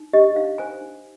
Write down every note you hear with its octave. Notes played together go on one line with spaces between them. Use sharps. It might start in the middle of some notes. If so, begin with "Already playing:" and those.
Already playing: D#4
G4 D#5
D#4 F5
C5 G#5
D#4